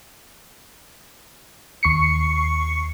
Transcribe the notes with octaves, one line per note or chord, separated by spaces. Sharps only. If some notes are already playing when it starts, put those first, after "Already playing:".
D#2 C#6 C7 C#7